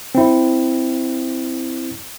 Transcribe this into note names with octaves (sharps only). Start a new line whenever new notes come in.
C4 E4